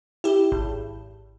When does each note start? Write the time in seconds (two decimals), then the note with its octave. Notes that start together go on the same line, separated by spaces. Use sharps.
0.24 E4 G4
0.52 G#1